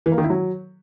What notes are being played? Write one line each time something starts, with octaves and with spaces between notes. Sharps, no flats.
E3
A#3
D#3
E4
F#3